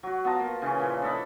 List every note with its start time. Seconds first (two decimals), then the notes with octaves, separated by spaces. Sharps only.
0.03 F#3 F#4
0.25 B3 F4 A5 A#5
0.39 A#3
0.62 C#3 E3 C#4
0.79 A#2 F3 E4
1.02 D4 A4 D#5 B5